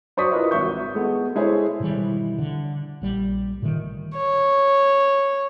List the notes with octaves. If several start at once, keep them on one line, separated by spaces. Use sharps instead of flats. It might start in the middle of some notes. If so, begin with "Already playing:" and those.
F#3 C5 D5 C#6 D#6 B6
E4 F4 A#4 B4 D5 D#5
G#1 F#3 E5 C#6 G6
G#1
G#3 A3 B3
G#3 E4 G#4 A4 C5 C#5
B2 D#3 E3 G3
D3
A#1 G3
A#2 D3 D#3 A3
C#5